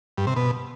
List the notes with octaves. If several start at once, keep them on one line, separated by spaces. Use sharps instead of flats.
G2
C3
B2